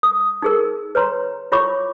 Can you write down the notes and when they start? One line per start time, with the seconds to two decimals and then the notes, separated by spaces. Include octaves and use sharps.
0.03 D#6
0.42 D#4 G#4 A#4
0.95 B4 C#5 A#5 C6
1.52 E4 F4 C#5 B5 C#6 D6